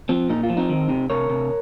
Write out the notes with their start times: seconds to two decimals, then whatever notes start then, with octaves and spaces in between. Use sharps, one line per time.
0.09 F3 C4
0.30 A#2 D#4
0.43 F4
0.50 F3
0.57 C4 D#4
0.70 D#3
0.89 C3
1.10 C3 A#4 C#5
1.30 C3